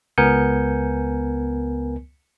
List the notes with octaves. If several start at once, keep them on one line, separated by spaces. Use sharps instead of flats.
C#2 B3 A#4 G#5 G6 C#7